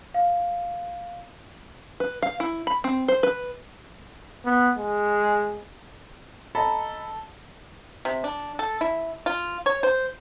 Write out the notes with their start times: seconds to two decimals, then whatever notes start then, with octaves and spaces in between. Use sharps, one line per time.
0.14 F5
2.00 B4
2.22 F5
2.40 E4
2.67 B5
2.84 C4
3.08 C5
3.23 B4
4.45 B3
4.78 G#3
6.55 A4 D#5 A#5 B5
8.05 C3
8.24 D4
8.59 A4
8.81 E4
9.26 F4
9.66 C#5
9.83 C5